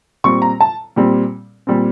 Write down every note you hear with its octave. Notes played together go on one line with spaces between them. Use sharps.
A#2 G3 C4 C#6
A#5
A5
A#2 G3 C4
A#2 G3 C4